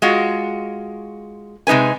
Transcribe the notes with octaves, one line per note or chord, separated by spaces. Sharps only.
G#3 F4 F#4
C3 G#3 D#4 B4 G#5